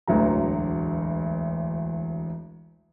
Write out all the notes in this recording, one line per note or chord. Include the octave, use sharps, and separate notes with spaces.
E1 A1 D2 F#3 A#5